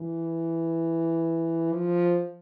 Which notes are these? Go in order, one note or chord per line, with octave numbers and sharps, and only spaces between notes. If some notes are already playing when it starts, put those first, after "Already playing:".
Already playing: E3
F3